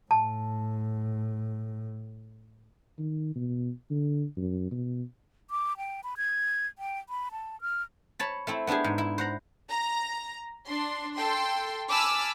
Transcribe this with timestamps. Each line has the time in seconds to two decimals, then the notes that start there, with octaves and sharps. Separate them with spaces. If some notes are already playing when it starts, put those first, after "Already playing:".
0.11 A2 A5
2.99 D#3
3.35 B2
3.90 D3
4.37 F#2
4.71 B2
5.50 D6
5.77 G5
6.04 B5
6.17 G#6
6.78 G5
7.09 B5
7.32 A5
7.61 F6
8.19 C#5 A5 B5
8.47 A3 C4 E4
8.67 B3 D4 E4 G4 G#4
8.84 G#2
8.98 E4
9.18 C5 F#5 A#5
9.70 A#5
10.66 D4 C6
11.15 A4 G5 C6
11.90 G#5 A5 B5 D6 E6 F6